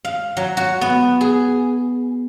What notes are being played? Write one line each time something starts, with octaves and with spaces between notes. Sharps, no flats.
F5
F#3
F#4
B3
G#4